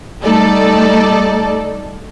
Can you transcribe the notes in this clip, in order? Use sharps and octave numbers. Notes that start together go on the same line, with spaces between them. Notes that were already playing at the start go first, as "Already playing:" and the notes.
G3 A3 D#4 A4 D5